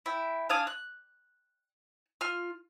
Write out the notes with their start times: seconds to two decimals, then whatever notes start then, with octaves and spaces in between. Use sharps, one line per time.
0.06 E4 G5
0.49 D4 F5 G#5 D#6
0.67 F#6
2.21 F4 F6